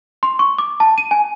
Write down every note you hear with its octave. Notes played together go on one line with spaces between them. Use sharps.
C6
C#6
D6
A5
D#7
G#5